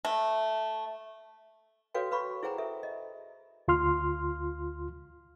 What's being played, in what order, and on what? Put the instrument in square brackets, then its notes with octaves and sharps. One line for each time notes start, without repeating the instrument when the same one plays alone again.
[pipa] A3
[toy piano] F#4 A4 B4 C#5 F5 G5
B4 F5 B5 C#6
E4 G#4 C5 F#5 G5 A#5
A4 E5
D#5
[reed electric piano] D2 F4 C6 F6